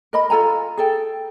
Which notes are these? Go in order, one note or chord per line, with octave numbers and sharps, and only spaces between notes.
A#4 D#5 B5
F4 A4 G#5 A#5
G#4 A4 G5